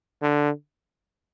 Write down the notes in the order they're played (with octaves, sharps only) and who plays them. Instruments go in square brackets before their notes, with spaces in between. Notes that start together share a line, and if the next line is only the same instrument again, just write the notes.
[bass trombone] D3